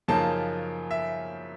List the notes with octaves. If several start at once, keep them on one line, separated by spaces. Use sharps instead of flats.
F#2 C#3 F3 A#3 D#4 A5
E5